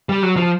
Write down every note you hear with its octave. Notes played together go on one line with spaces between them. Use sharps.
G3
F#3
F3